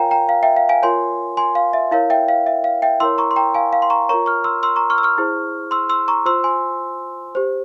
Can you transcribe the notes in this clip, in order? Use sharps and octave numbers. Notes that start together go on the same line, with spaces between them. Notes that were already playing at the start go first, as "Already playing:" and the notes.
Already playing: F4 A#4 C#5 F5 G5 G#5 A#5
G5 A#5
F5
E5 G5
F5
F5 G#5
F4 A#4 C#5 G#5 C6
G#5 C6
F5
E5
E4 A#4 C#5 F5
E5 G5
F5
E5
F5
E5 G5
E4 A#4 C#5 C6 E6
A#5 C#6
C6
G5 A#5
F5 G#5
F5
C6
A#5 C#6
F4 A#4 C#5 A#5 C#6
C#6 F6
C6 E6
C6 E6
A#5 C#6
C#6 F6
E6
C#6 F6
E4 G#4 C5
C6 E6
C6 E6
A#5 C#6
F4 C5 C6 E6
G#5 C6
G4 C5